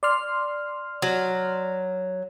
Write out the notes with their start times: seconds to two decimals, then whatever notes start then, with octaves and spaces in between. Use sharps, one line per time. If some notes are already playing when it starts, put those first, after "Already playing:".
0.03 D5 C6 F6
1.02 F#3